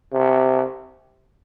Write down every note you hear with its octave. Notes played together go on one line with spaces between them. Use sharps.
C3